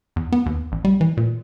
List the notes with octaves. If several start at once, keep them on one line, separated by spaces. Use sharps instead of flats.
E2
B3
D#2
A1
G3
E3
A#2